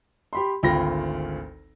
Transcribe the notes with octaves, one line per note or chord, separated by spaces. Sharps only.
G4 B5 C6
G#1 D2 F4 G5 B5 A#6